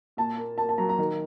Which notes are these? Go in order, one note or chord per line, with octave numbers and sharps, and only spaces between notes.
A#2 A5
A#3
A#3 A5
A5
F#3 A#5
A#5
D#3